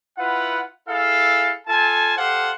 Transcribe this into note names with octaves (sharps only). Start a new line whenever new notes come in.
E4 F4 B4 F#5
E4 G#4 A4 F5
F4 A4 G#5 A5
G4 A4 C5 F5 F#5